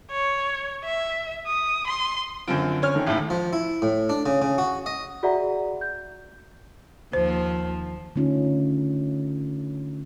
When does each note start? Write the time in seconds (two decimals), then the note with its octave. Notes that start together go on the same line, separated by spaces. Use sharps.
0.11 C#5
0.84 E5
1.47 D#6
1.87 C6
2.48 F#2 D3 F3 C4 F4 D7
2.82 C#4 C#5 F6
2.95 D#3 E3 A3
3.06 A1 D#2 A2
3.30 F3
3.53 E4
3.82 A2
4.09 D4
4.26 C#3
4.42 C#3
4.58 F#4
4.86 D#5
5.23 F#4 G#4 D5 E5 F#5 A#5
5.81 G6
7.13 D#2 F3 C5
8.16 D3 A3 C#4 D#4 F4